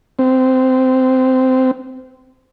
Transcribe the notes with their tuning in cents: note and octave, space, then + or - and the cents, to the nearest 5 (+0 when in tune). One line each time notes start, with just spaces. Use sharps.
C4 -15